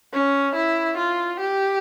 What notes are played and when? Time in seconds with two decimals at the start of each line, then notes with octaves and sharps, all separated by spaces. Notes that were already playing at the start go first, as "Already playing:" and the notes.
0.13 C#4
0.55 E4
0.97 F4
1.40 G4